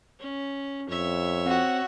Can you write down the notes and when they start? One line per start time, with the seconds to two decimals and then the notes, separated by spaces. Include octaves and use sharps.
0.20 C#4
0.89 F2 C#5 E5
1.46 C4 F#4 F#5